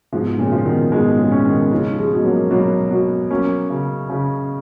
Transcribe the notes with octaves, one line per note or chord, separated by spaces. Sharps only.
G#2 B2 F3
A#2 C#3
F3
B2 D#3
G#2 B2 G#3
A#2 C#3
C#4
B2 D#3
C#3 F3 D#4
F3 G#3
B2
F#3 A#3
B2 F#3 A#3
B2
F#3 A#3 C#4
C#3
C#3